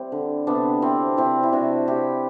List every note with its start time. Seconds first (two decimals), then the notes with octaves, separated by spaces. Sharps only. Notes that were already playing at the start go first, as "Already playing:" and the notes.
Already playing: G3 C4 E4
0.12 D3
0.47 C3 B3 D4
0.82 F#3 C4 E4
1.17 C3 C4 E4
1.43 E4
1.52 C3 D4 F#4
1.87 C3 E4 G4